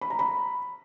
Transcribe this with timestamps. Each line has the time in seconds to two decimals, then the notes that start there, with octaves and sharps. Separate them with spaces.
0.01 B5
0.10 A#5
0.19 B5